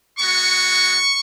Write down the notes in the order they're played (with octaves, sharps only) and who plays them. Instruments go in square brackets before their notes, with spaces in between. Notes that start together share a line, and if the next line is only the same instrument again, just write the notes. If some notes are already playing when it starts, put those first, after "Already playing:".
[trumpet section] G#3 B3 F#4 C#6